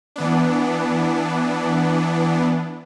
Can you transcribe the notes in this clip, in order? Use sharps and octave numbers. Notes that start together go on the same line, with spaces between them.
E3 B3 D4